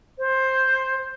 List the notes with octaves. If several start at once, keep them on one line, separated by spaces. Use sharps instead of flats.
C5